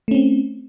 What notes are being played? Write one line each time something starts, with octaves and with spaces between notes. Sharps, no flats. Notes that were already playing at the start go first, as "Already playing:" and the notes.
A3 C4 C#4